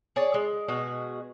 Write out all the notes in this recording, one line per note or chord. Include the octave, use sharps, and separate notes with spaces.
G#4 C#5 D5
G#3
B2 G#3 F#4